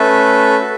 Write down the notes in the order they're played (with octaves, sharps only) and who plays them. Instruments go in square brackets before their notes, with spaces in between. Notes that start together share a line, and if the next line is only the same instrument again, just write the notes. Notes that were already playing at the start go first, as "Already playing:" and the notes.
Already playing: [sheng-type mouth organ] A3 C#4 A4 B4 E5
F#4 A4